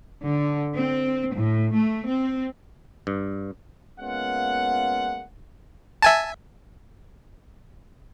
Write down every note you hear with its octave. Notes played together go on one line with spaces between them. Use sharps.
D3
C4
A2
A3
C4
G2
G#3 A#3 B3 C#4 F4 F#5
E5 G#5 A5